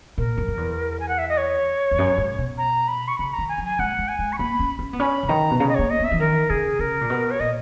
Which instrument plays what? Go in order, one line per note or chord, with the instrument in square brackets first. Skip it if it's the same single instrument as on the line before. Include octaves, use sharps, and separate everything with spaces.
[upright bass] A#2 [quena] A#4
[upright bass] F#2
F#2
E2
[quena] G#5
F#5
E5
D#5
C#5
[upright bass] E2
F#2
G#2
B2
[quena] A#5
B5
C#6
[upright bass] C#3 [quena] B5
[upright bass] D#3 [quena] A#5
[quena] G#5
[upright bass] F#3
[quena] G#5
[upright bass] G#3 [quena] F#5
[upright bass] G#3
[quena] G#5
[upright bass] G#3
[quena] C#6
[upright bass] A#3 [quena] B5
[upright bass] C#4
C#4
B3
[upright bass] C#4 [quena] B5
[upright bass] C#3
[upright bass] D#3 [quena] A#5
[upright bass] B2
[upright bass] C#3 [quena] A#5
[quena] D#5
[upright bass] A#3 [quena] C#5
[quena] D#5
[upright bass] B3 [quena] E5
[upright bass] E3
[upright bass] D#3 [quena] A#4
[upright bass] C#3 [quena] G#4
[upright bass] C#3 [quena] A#4
[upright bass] A#2
B2
[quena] C#5
[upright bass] A#2 [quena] D#5